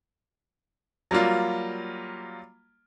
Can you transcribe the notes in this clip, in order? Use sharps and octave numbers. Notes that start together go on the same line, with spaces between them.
F#3 G3 A#3 F4